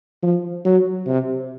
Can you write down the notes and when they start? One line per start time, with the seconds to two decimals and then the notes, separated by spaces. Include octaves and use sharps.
0.23 F3
0.65 F#3
1.07 C3